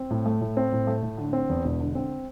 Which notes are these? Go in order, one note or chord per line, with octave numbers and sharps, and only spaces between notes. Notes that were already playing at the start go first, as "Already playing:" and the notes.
Already playing: C4
A2
A3
A2
C4
A2
A3
A2
D3
C4
E2
E1
D3
C4